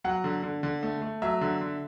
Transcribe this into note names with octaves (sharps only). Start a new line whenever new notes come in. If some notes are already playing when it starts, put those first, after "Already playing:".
F#3 F#5
D3
D3
D3
A3
A3
F#3 E5
D3
D3